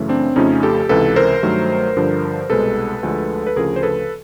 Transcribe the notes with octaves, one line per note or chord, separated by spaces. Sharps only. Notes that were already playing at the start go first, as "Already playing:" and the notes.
Already playing: F#2 C#3 E3 A3
C4 D4
F2 C#3 F3 A3 C#4 D#4
G4 A4
C#2 C3 E3 A4 B4
A#4 C5
G2 D#3 F#3 A3
G2 D3 F3
C2 B2 G#3 A4 B4
D2 D3 F3 G#3
B4
D2 C#3 F3 G#4 A#4
C5
A4 B4